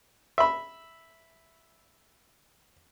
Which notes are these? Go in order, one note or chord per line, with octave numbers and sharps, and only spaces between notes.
E5 B5